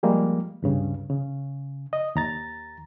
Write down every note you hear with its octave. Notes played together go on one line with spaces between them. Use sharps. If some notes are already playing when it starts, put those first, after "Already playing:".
F3 G3 G#3 A#3
C#2 G2 C#3
C#3
D#5
D#2 A#5 A6